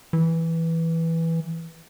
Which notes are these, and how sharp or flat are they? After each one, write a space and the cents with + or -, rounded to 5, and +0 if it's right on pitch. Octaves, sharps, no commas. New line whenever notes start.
E3 -5